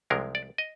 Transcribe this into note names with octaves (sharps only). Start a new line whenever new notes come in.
C2 C3 F3 G#3 A#4
D5
D#5